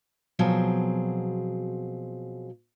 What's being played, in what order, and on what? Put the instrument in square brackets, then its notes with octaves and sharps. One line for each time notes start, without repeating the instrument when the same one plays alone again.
[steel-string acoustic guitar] B2 F3 F#3 C4 G#4